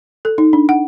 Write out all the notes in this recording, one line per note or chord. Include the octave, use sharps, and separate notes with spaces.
A4
D#4
D4
F#5